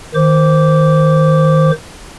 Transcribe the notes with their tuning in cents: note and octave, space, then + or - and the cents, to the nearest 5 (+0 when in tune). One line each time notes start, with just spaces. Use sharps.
D#3 +5 C5 +0 D6 -15